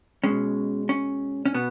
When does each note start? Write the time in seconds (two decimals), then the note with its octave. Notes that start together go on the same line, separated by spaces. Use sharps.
0.24 B2 G#3 C#4
0.89 C#4
1.45 C#4
1.54 B2 B3